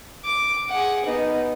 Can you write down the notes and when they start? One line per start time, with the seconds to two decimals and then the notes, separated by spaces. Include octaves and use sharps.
0.25 D6
0.70 G#4 F#5
1.05 B3 D#4